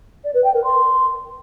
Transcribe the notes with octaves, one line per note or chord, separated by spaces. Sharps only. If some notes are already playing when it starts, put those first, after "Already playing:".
D5
B4
G5
A#4
C6